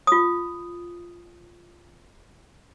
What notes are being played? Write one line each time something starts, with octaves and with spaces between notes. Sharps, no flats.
F4 D#6